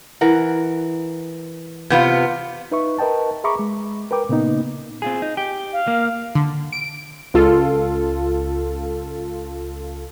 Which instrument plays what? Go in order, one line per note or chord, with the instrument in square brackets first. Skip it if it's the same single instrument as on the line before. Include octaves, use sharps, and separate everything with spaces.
[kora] E3 A#4 F#5
[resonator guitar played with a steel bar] C3 B3 F4
[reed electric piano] D#4 B4 E5 C#6
A#4 B4 D#5 G5 A5
G#4 E5 A#5 B5 C#6 D6
G#3
A#4 B4 G5 D6
A#2 C#3 A#3 B3 D#4
[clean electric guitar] C4 F4 G#4
D#4
G4
[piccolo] F5
[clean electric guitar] A#3
[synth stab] D3
D7
[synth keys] C#2 F4 A4